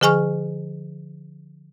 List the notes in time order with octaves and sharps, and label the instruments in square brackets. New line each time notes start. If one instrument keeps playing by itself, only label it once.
[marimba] D3 F3 G#4 G#5 C#6 F6